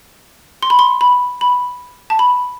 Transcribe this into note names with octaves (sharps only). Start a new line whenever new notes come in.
C6
B5
C6
B5
B5
A5
B5